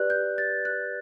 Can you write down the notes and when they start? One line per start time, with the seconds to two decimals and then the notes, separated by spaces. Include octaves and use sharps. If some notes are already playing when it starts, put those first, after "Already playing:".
Already playing: G4 B4 D5 F#6
0.10 G6
0.38 A6
0.65 F#6